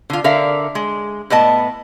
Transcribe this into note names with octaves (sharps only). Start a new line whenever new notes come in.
D3 F4
D3 A#4 E5 F5
G#3
A2 B3 D#5 A5